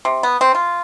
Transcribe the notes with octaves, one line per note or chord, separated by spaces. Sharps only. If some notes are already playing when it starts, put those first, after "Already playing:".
C3
B3
C4
F4